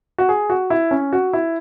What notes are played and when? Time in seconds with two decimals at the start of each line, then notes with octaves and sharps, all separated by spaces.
0.18 F#4
0.29 G#4
0.50 F#4
0.70 E4
0.91 C#4
1.13 F#4
1.33 E4